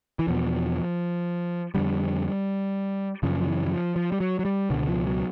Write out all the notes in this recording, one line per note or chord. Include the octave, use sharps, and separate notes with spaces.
E3
E2 B2 F3
F2 D3 G3
F#2 C#3 F3
F3
E3
E3
F3
F3
G3
F#3
F#3
G3
C#2 B2 D3
F3
F#3